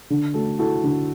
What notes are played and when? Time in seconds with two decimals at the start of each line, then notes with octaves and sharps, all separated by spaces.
0.10 D3
0.34 A3 F#4 A4
0.59 E4 F#4 A4
0.84 D3